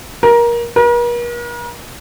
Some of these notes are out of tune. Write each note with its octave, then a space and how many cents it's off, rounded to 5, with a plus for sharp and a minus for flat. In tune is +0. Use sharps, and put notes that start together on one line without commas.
A#4 +20
A#4 +45